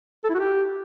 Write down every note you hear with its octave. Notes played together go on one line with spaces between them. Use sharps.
A4
E4
F#4
G4